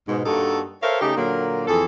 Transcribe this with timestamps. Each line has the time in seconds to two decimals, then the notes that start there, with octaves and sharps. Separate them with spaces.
0.08 G#2 B2
0.26 G2 A#3 D#4 F#4 A4
0.82 A4 A#4 C5 C#5 E5 F5
1.01 C#3 A3 D#4 G4
1.16 A#2 D3 F#3 A#3
1.67 F2 E3 G#4 A4